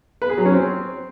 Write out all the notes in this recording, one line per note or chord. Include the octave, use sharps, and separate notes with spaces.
B4
G#4
F#3
C#4
C4